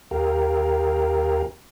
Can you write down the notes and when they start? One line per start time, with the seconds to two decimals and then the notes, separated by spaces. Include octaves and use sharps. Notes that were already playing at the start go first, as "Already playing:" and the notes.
0.11 D#2 G4 A#4 F5 G5 A#5